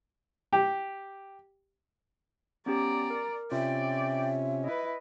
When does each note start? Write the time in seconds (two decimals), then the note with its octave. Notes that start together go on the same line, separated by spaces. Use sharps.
0.53 G4
2.66 B3 C#4 G4 D5 A#5
3.10 A#4
3.52 C3 C#4 F4 D5 E5 G5
4.64 E4 B4 D#5